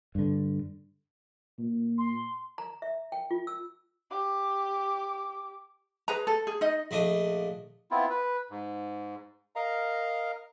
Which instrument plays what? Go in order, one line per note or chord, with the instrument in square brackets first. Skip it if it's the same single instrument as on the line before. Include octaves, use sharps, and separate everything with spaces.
[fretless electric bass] G2 D3
[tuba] A#2
[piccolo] C6
[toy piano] A#5
E5
G5
F4
E6
[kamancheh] G4 D6
[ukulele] G#4 B4 A#5
A4
G#4
D#4 D#5
[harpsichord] A#1 A3 D4 D#5
[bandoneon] B3 C4 E4 F4
B4
G#2
A#4 D#5 F5 A#5